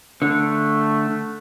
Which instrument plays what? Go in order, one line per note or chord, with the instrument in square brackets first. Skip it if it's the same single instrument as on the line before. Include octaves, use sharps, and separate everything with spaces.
[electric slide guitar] D3 [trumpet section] A3